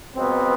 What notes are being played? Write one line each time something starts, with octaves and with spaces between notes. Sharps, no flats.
C#2 B2 F#3 B3 C4